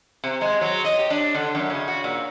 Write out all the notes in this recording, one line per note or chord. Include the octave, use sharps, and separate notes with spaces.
C3
G#3
F#3
D#5
G4
D4
D3
F#2
C#3
F#4
A#2